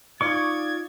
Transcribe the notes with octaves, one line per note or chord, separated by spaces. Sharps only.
D#4 F4 D5 F5 C#6 G#6